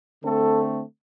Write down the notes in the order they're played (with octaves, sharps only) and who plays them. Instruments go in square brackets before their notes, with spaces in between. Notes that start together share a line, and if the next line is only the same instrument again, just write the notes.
[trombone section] D3 A3 C4 A4